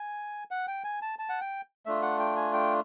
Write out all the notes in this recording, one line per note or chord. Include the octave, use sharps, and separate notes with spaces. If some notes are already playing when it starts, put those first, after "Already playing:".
Already playing: G#5
F#5
G5
G#5
A5
A5
F#5
G5
A3 D4 F4 E5
F#5
G5
G#5
G5